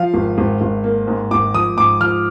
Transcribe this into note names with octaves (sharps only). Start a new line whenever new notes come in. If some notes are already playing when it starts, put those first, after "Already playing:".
Already playing: F3 F5
G#1
G#1
G#1
A#3
G#2
G#1 D6
F3 D#6
G#2 D6
F3 F6